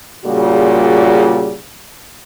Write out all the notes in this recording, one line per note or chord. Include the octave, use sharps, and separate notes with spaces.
A#2 C#3 G3 F4 F#4 G#4